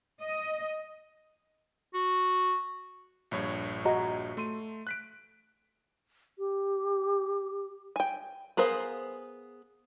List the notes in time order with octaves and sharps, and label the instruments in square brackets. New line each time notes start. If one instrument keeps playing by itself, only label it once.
[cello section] D#5
[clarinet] F#4
[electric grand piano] A#1 G2 C#5
[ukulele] F#4 D#5 A#5
[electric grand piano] A3 C6 D#7
F#6 B6 D7
[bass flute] G4
[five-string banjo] G5 G#5
B3 G#4 A#4 C5 F5